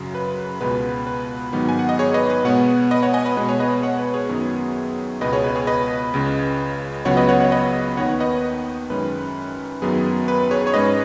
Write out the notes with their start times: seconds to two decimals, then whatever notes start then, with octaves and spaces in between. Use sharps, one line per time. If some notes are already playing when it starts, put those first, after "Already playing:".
Already playing: F#2 C#3 F#3
0.15 B4
0.61 C#2 B2 G#3 B3 B4
1.07 B4
1.53 G#2 D#3 F#3 B3
1.69 G#5
1.79 F#5
1.89 D#5
1.99 G#4 C#5
2.14 B4 D#5
2.30 B4
2.45 B2 G#3 B3 C#5 F#5
2.91 B4 D#5
3.02 C#5 F#5
3.14 D#5 G#5
3.26 B4
3.37 B2 G#3 B3 B4
3.49 G#4 C#5
3.60 B4 D#5
3.83 C#5 F#5
3.99 B4
4.14 G#4 C#5
4.29 F#2 D#3 F#3 B3
5.21 C#2 B2 B3 B4 D#5
5.33 G#4 C#5
5.44 B4
5.56 G#4 C#5
5.67 B4 D#5
6.14 C#2 C#3 G#3
7.05 C#2 C#3 F#3 B3 C#5 F#5
7.17 B4 D#5
7.29 C#5 F#5
7.40 C#5 F#5
7.52 B4 D#5
7.97 D#2 D#3 B3 C#5 F#5
8.20 B4 D#5
8.90 F#2 D#3 G#3 C#4 B4
9.82 F#2 D#3 F#3 B3 G#4
10.28 B4
10.51 G#4 C#5
10.67 C#5
10.74 G#2 G#3 C#4 B4 D#5